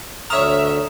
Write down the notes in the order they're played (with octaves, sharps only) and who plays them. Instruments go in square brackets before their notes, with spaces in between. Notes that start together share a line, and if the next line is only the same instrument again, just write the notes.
[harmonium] D2 D3 [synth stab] C#5 F6 [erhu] E5 [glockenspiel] A#5 D#6 E7